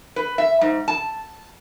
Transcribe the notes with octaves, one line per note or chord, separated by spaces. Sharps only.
B4
E5
G#2
A5